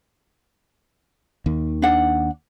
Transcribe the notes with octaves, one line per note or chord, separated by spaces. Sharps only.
D#2 D#3
D4 F#5